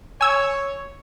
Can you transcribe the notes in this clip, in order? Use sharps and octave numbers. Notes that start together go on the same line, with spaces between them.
C#5 G#5 E6 G#6